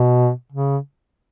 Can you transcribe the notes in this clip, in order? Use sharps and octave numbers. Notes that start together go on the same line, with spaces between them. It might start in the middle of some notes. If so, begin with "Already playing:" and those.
Already playing: B2
C#3